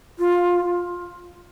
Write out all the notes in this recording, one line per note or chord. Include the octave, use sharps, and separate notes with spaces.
F4